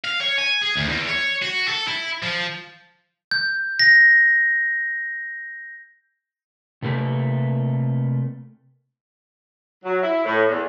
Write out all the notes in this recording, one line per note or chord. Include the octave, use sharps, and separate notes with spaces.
F5
C#5
G#5
G#4
D2
E2
C#5
F#4
A4
E4
F3
G6
A#6
C3 A3 A#3 B4
F#3
E4
A2
E2